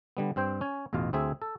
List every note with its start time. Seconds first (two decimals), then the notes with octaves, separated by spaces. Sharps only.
0.17 D3 G3 B3
0.36 G2 C4 C5 G5
0.61 C#4 G#5
0.93 A1 E2 B2 F4 F5
1.13 D2 C4 G#4 E5 G#5
1.42 A4